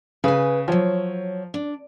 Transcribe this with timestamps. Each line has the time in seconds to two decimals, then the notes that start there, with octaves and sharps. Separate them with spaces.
0.24 C#3 B4 G#5
0.68 F3 F#3 C#5
1.54 D4